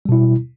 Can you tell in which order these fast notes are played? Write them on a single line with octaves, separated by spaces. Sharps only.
G3 B2 E4